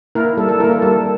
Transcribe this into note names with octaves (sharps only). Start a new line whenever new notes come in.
A#3 E4 A#4
G3 A4
A4
A#3 E4 A#4
A4
G3 A4